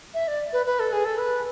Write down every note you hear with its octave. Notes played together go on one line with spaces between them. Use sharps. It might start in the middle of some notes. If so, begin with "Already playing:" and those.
E5
D5
B4
B4
A4
G#4
A4
B4